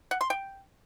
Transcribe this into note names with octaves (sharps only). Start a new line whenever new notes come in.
F#5
C6
G5